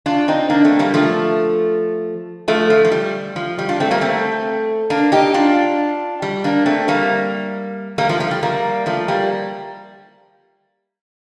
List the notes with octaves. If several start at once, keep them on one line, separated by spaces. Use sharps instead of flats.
D4 F4
C4 D#4
A#3 D4
A3 C4
G3 A#3
F3 A3
F3 A3
F3
F3
G3
F3
G3
D4 F4
A3 C4
G3 A#3
A3 C4
A#3 D4
D#4 G4
D4 F4
G3
A#3 D4
A3 C4
G3 A#3
G3 A#3
F3 A3
F3
G3
G3 A#3
F3 A3
G3 A#3